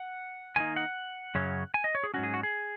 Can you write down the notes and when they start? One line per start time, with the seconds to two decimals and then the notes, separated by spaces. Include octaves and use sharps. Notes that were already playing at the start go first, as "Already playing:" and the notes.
Already playing: F#5
0.56 D#3 A#3 D#4 G#5
0.76 F#5
1.35 F#2 C#3 F#3 C#4
1.74 G#5
1.84 D#5
1.95 C#5
2.04 G#4
2.14 G#2 F#3 C#4 F#4
2.23 G#4
2.34 F#4
2.43 G#4